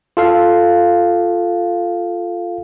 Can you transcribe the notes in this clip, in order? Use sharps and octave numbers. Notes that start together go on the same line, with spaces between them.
F4 A4 F5